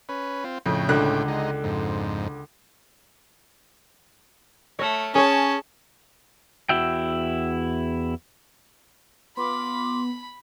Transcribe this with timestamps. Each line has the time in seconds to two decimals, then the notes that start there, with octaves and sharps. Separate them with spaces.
0.09 C#4 B4
0.44 C4 F4
0.66 F2 A2 C#3 G5
0.89 C#2 D3 F#6
1.28 G#3 D#4
1.64 F2 G#2
4.79 A3 C#5 F6
5.15 C#4 G#4 C#5 A5
6.69 E2 E4 F#4 E5 G5
9.37 B3 F4 B5 C6 D6